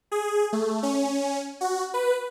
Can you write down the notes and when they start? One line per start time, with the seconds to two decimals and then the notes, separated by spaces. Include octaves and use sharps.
0.11 G#4
0.53 A3
0.83 C#4
1.61 F#4
1.94 B4